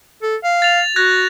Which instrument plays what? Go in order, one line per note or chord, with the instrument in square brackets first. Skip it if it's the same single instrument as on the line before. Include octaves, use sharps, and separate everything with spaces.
[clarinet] A4
F5
[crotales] A6 F7
[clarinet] F#4 [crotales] F#6 G#6 A#6